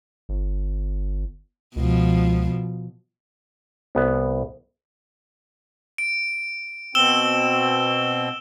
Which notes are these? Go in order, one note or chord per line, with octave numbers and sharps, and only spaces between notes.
G1
C#2 B2 F3
C2 B3
D7
B2 C4 E6 E7 G7